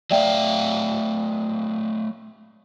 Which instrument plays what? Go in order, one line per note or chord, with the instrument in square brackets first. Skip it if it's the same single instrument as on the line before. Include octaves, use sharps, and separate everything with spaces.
[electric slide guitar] F#3 A3 F5 [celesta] D5 E5 G5